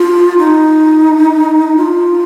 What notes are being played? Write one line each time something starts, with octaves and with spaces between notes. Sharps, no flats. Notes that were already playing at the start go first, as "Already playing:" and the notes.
Already playing: F4
D#4
F4